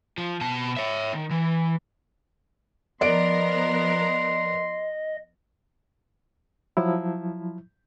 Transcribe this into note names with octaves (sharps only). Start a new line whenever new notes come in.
F3
B2 A5
C#5 E5
D#3
E3
F3 B3 A#4 D5 D#5 C6 D7
F3 F#3 E4